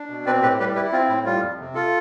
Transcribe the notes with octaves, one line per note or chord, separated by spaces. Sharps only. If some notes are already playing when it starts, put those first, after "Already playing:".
Already playing: D4
B2
C4 B4 D5
A2 G4 B4
G3 G4 B4
E4 G4 B4
C4 F4
A2 E4
G3 F4
F2
C3
F4 A4